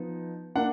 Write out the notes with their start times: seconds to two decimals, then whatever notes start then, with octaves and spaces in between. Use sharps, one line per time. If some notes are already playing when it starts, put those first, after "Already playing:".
Already playing: F3 B3 D#4
0.55 A#3 D4 F#5